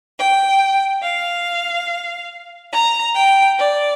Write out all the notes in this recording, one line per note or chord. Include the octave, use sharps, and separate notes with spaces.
G5
F5
A#5
G5
D5